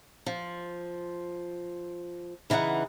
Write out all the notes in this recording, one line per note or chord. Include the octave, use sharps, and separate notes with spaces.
F3
C#3 E3 D#4 F5 F#5